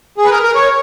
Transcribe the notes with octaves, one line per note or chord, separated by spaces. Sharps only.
G#4
B4
A#4
A#4
C#5